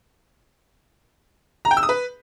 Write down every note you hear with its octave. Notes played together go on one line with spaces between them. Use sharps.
A#5
G5
E6
D#6
B4